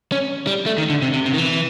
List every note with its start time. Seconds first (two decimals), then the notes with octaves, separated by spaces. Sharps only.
0.12 C#4
0.47 G3
0.66 A3
0.78 D#3
0.90 D3
1.02 C3
1.13 C3
1.26 C3
1.33 D#3
1.38 E3